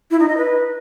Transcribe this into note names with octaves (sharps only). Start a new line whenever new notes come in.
E4
D#4
D#5
B4